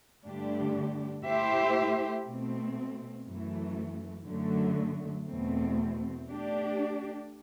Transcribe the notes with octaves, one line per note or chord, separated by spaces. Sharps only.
G2 D3 A3 D4 G4
A3 E4 G4 C5 E5
B2 A3 C4
F#2 E3 A3
F#2 D3 F#3 A3
E2 B2 A3 C4
A3 D4 G4 D5